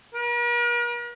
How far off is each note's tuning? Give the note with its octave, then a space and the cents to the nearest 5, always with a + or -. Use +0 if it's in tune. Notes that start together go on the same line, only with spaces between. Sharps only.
A#4 +45